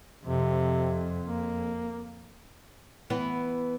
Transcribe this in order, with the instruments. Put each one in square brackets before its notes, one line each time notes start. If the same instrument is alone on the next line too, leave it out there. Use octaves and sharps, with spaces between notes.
[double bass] F2 [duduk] C3
[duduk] A#3
[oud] E3 B3